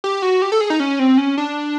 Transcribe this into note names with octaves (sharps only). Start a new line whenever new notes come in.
G4
F#4
G4
A4
G#4
D#4
C#4
C4
C#4
D4